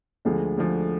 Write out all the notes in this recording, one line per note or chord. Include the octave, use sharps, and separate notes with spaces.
D2 D3 F3 G#3
D2 D3 F3 G#3